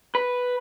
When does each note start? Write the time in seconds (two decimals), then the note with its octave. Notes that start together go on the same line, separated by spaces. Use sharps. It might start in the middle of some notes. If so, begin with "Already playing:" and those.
0.15 B4